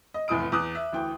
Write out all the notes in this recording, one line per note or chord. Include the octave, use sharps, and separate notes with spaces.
D#5
F1 E2 A2 D#6 D7
E2 D6 D#6 F#6
E5
D2 E3 G5